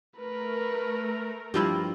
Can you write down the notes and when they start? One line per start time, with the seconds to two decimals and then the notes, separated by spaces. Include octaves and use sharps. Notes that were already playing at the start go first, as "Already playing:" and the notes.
0.18 A3 A#4 B4
1.54 G2 F3 G3 E4 F4 G4